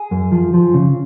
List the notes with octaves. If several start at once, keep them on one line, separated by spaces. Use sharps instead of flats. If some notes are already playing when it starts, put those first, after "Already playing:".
Already playing: G#4
F#2
F3
F3
C#3